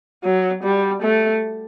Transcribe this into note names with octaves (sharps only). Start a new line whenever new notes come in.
F#3
G3
A3